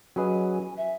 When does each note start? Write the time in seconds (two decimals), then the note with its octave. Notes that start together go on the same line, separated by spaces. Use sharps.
0.16 F#3 C#4 G#4 B4 D#5 G#5
0.77 E5